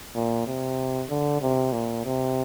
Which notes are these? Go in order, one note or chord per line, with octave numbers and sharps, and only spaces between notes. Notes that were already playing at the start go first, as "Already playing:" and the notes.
A#2
C3
D3
C3
A#2
C3